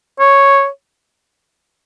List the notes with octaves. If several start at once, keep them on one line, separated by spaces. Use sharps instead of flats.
C#5